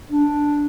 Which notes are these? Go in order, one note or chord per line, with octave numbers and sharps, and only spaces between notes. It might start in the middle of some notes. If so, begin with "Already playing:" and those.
D4